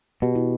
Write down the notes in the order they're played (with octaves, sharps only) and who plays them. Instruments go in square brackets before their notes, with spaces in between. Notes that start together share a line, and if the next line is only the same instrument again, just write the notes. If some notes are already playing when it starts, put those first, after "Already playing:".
[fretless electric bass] B2 [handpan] G4
[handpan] E4